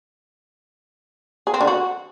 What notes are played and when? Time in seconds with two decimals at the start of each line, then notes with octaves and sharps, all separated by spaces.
1.47 G#4
1.54 C4
1.61 D3
1.67 F#4